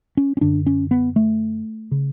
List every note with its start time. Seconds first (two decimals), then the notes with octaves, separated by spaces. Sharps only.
0.17 C#4
0.37 C#4
0.41 F#2 D3 D4
0.66 C#4
0.91 B3
1.16 A3
1.91 C#3